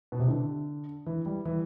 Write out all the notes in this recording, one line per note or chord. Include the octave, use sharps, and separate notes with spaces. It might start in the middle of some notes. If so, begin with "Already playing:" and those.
B2
C3
D3
E3
G3
E3